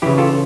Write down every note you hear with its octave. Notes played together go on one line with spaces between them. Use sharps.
C#3 E3 E4 G4
F4 A4